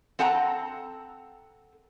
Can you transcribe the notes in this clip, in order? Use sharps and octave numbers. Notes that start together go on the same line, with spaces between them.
C4 A4 F#5 A5 A#5